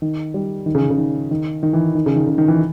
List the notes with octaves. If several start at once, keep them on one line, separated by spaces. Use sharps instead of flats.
D#3
G3
D#3
C#3
D#3
C#3
D#3
D#3
D#3
E3
D#3
C#3
D#3
C#3
D#3
E3